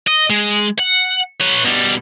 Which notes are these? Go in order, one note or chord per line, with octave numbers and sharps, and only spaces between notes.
D#5
G#3
F#5
B4 C#5
B2 G3